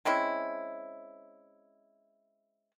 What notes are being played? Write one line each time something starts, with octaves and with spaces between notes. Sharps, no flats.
G#3 C4 C#4 E4